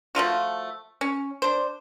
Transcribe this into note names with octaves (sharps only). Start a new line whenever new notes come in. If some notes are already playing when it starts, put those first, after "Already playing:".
F3 A3 F4 F#4
C#4
D4 C5